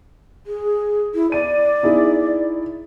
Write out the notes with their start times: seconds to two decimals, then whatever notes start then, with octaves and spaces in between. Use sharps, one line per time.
0.47 G#4
1.15 E4
1.32 D5 D#7
1.83 D#4 E4 G#4